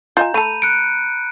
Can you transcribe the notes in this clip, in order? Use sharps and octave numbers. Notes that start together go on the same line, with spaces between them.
F4 D#5 G#5 A#5 G6
A3 A4 B5 D#7
F#6 C#7 D7